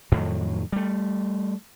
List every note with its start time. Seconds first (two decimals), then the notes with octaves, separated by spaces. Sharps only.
0.12 F2 A2 D#3 F#3
0.72 G3 A3